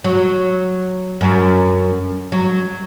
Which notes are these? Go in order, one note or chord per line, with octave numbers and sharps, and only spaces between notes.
F#3
F#2
F#3